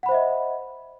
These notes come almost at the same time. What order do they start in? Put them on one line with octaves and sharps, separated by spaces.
F#5 B5 C5 E5 D#5